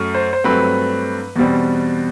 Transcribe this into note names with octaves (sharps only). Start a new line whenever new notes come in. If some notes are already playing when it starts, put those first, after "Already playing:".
Already playing: F#2 F#3 A3
C5
C5
G2 F#3 A3 C4 B4
E2 B2 G3 C4